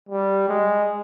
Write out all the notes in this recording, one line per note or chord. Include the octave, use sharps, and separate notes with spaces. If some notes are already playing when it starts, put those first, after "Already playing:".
G3
G#3